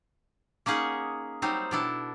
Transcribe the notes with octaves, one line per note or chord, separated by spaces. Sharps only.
A#3 C#4 D#4 G#4 F#5
F#3 G3 C4 D#4 C5
B2 D4 E4 A4